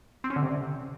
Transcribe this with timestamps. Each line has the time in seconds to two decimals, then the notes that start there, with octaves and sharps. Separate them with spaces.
0.24 C4
0.30 C#4
0.36 D3
0.42 C3